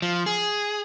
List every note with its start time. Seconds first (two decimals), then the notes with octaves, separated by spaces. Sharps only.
0.02 F3
0.26 G#4